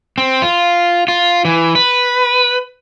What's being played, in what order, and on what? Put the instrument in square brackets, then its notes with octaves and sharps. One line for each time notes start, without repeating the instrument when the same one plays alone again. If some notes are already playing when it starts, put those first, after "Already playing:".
[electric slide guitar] C4
F4
F4
E3
B4